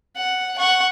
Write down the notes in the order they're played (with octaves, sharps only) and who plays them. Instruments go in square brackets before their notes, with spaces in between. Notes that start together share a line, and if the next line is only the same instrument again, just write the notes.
[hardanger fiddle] F#5
F#5 C#6